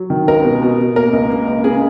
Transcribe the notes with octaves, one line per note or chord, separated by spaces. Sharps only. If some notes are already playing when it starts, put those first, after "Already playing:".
Already playing: F#3
D#3
C#2 A#4
B2
B2
B2
A#3 A#4
C#2
A#3
C#2
C#3 G#4